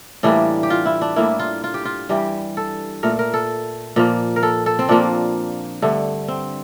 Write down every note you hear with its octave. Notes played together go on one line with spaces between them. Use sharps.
A2 E3 G3 A#3 D4
G4
F4
E4
D4
A2 G3 A#3 E4
F4
F4
G4
F4
G2 E3 G3 G4
A4
A#2 A3 A#4
A#4
A4
A#2 F3 A#3
A#4
A4
A4
C4
A#2 F3 A#3 D4
G2 D3 A3
C4